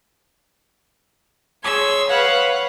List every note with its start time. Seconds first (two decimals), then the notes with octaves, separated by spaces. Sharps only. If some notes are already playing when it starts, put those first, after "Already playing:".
1.63 G#4 C#5 C6 E6 G#6
2.09 B4 C#5 F5 F#5